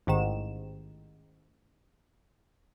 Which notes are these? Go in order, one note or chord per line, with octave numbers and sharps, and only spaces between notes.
A1 G#2 D#3 E7